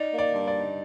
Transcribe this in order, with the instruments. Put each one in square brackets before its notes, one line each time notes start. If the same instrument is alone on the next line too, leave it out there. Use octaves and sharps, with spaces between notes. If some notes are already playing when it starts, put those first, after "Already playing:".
Already playing: [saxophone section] D#4 [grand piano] D5
[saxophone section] A#3
[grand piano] D5
[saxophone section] G2
[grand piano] D5
[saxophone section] D#4